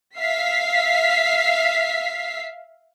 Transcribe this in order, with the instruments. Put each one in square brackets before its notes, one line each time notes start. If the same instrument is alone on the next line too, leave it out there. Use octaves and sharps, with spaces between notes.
[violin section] E5 F5 B6 C7